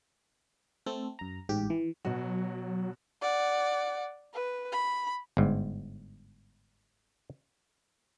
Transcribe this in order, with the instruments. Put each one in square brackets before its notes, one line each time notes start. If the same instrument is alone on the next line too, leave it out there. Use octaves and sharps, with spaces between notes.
[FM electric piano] A3 C4 A4
F#2 A#5
A1 G#2 G4
E3
[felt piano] B2 F#4 [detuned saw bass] F#3
[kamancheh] D5 F#5
B4
B5
[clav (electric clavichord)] G1 G#2